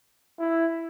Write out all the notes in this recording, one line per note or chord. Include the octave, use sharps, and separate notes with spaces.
E4